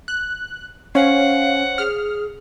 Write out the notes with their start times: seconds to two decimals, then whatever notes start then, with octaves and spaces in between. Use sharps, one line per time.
0.08 F#6
0.95 C#4 C5 C#5 F5 F#5
1.78 G#4 F6